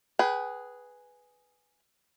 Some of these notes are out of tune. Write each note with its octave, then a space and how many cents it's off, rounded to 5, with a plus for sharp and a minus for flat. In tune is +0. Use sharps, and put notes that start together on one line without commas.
G#4 +0 B4 +0 G5 -40